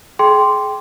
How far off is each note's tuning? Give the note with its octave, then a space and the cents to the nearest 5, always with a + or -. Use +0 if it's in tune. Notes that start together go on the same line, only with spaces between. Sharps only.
G#4 +30 G5 +0 C6 -5